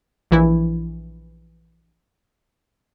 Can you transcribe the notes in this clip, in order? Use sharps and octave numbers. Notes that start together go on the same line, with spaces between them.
A#1 E3 E4